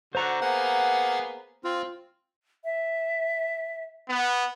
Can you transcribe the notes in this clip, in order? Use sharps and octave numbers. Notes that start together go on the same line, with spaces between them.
D3 F#4 C5 A#5 F#6
A#3 B3 G#4 F#5
C4 F4
E5
B3